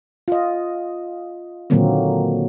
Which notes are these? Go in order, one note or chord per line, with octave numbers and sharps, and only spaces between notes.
F4 D#5
A#2 D3 D#3 F#3 A#3 C4